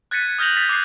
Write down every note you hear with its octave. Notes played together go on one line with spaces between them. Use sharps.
F#6 G#6 A6 B6 C#7 D#7
D#6 F6 G6 A#6 F7 F#7
A6 B6 F7
D6 F#6 A6 C7